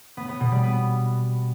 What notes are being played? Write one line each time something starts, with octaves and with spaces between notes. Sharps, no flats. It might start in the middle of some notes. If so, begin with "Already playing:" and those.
B3
B3
B2
G3
B3